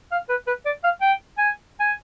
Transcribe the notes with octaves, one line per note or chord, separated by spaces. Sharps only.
F5
B4
B4
D5
F5
G5
G#5
G#5